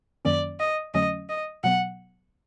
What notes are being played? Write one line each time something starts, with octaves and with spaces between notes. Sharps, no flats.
F#2 D#3 F#3 A#3 C#4 D5
D#5
F2 D3 F#3 A3 C#4 D#5
D#5
B2 F#3 B3 F#5